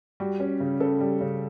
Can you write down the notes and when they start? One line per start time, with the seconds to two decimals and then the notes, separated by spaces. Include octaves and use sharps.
0.20 G3 F#4
0.40 C#4
0.60 C#3
0.80 C#3 A4
1.00 G3
1.21 C#3